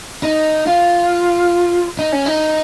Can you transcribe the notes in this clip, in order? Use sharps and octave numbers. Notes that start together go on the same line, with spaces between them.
D#4
F4
D#4
C#4
D#4